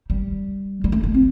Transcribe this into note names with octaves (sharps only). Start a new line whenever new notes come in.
G3
G3
A3
A3
C4